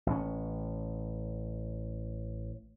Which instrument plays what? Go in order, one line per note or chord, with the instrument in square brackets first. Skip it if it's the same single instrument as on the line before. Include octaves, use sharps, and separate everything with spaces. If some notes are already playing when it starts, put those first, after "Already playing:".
[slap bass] A1 C#4